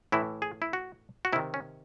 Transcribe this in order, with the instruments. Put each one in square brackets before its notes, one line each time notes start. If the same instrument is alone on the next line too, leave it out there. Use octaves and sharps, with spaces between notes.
[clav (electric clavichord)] A2 E3 E4
G#4
E4
F#4
F#4
C3 E4
D#3
C#4